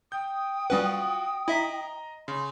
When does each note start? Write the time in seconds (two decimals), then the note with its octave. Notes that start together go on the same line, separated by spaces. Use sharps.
0.12 G5 D#6 G6
0.70 G3 C#4 F4 F#4 B4 F#5
1.48 E4 D#5 E5 A#5 B6
2.28 C#3 C6